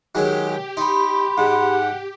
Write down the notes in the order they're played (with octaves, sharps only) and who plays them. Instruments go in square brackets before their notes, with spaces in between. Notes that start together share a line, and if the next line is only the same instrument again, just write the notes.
[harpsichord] D#3 F#3 G#3 [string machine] G4
[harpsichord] D#4 [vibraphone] B5 C6
[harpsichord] G#2 [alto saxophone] F#5